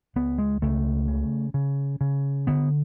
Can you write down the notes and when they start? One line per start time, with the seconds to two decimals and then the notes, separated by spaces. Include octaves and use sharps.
0.16 C#2 B3
0.38 G#3
0.62 C#2 A3
1.08 C#3
1.54 C#3
2.01 C#3
2.47 D3 B3